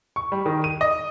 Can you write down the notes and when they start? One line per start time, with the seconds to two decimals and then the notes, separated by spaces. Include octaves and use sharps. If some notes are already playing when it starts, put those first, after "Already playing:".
0.16 C#6
0.32 G3
0.46 D#3
0.64 D#7
0.81 D#5